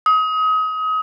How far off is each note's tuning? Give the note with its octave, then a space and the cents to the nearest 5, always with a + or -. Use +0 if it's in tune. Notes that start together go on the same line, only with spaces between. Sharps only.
D#6 +30